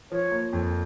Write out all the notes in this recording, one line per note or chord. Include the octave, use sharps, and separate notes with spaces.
F3 C#5
A#3
F2